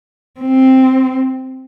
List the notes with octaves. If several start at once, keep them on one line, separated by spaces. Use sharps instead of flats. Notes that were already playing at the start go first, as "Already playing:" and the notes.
C4